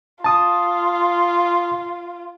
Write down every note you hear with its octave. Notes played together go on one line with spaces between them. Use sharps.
F4 A5 D#6